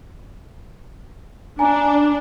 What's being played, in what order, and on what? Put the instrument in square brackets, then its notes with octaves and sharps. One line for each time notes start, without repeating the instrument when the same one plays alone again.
[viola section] D4 [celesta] G#5 A#5